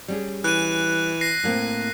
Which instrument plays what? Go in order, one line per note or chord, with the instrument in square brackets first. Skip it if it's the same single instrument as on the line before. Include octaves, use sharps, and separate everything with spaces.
[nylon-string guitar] G3 C#4 G#4
[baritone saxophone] E3 [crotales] F#6 D#7
[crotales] A#6 C7
[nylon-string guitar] A2 A#3 C4